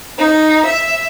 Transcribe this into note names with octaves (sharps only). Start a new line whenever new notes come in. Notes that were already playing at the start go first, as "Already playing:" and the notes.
D#4
E5